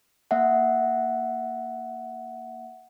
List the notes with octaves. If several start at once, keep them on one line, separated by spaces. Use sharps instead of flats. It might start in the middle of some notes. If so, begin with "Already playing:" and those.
A#3 E5 F#5